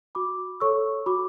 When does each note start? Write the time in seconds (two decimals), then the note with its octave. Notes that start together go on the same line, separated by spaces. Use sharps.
0.15 F#4 B5 D6
0.60 A4 C#5 C#6 E6
1.06 F#4 B5 D6